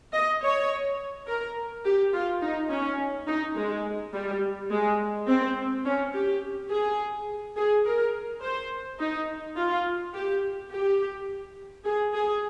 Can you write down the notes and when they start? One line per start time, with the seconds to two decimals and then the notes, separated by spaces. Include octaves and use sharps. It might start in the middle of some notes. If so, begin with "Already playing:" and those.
0.13 D#5
0.41 C#5
1.27 A#4
1.85 G4
2.13 F4
2.41 D#4
2.70 C#4
3.27 D#4
3.56 G#3
4.13 G3
4.70 G#3
5.27 C4
5.85 C#4
6.13 G4
6.70 G#4
7.56 G#4
7.85 A#4
8.42 C5
8.99 D#4
9.56 F4
10.13 G4
10.71 G4
11.85 G#4
12.13 G#4